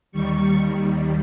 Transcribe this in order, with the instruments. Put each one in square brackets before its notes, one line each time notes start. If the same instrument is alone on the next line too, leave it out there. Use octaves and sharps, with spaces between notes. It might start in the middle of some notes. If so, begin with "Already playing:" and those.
[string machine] D#2 D#3 G3 C#6